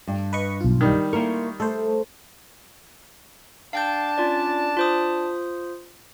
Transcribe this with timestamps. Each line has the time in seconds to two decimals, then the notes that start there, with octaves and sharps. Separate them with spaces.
0.07 G2
0.33 B4 D#5 C#6
0.61 B1 F4
0.81 D#3 G3
1.13 A#3 E4 A#4 C6 C#6
1.60 A3 A4 C5
3.73 D4 F5 G5 A5 G6
4.18 C#4 F4 D5
4.77 F4 C5 D#6